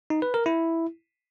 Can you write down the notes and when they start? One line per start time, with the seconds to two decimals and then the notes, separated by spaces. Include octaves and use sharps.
0.10 D#4
0.22 B4
0.34 A#4
0.46 E4